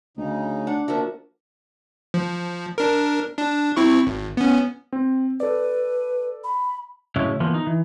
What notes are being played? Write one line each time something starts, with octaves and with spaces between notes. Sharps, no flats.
D2 C#3 D#4
D4 F#5
F3 A#3 D4 F#4 E5
F3
D4 A#4
D4
C4 E4 C#6
G#1
B3 C#4
C4
A4 B4 D5
B5
A2 C#3 F#3 G#3 C#4 E4
E3 F3 A#3 B3
D#4
E3